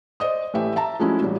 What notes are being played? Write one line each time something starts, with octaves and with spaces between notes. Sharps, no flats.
C5 D5 D#5 D#6
A1 E3 A3 G4 E5
E5 A5 A#5
F3 G#3 A3 C#4 E4 F#4
A1 G3